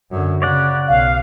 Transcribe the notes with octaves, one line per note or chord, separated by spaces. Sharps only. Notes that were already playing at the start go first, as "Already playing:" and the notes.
F#2 D3
C#3 C#5 D5 F#5
B1 F5